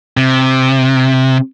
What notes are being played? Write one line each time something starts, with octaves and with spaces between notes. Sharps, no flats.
C3